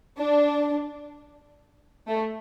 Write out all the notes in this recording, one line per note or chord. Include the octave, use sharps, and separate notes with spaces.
D4
A3